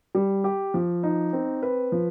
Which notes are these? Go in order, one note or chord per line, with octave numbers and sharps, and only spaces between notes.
G3
G4
F3
D#4
C4
B4
F3